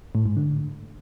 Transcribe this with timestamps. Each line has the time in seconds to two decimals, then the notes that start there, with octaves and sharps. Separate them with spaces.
0.15 A2
0.26 G#2
0.37 D3